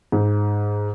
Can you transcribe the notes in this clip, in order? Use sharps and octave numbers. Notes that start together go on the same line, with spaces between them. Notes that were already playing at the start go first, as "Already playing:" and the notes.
G#2